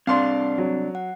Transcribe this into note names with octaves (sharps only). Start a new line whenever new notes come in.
C2 C4 D4 F5 C6
F#3
F#5